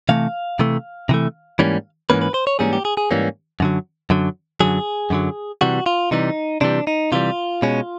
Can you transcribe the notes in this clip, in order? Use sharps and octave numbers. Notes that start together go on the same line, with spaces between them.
C3 E3 A3 F5
C3 E3 A3
C3 E3 A3
G#2 E3 G3 A#3 C#4
G#2 E3 G3 A#3 C#4 B4
B4
C5
C#5
G#2 E3 G3 A#3 C#4 G#4
G4
G#4
G#4
G#2 E3 G3 A#3 C#4
F#2 D3 F#3
F#2 D3 F#3
F#2 D3 F#3 G#4
F#2 D3 F#3
C3 E3 G3 F#4
F4
C3 E3 G3 D#4
C3 E3 G3 D4
D#4
C3 E3 G3 F4
B2 G#3 C#4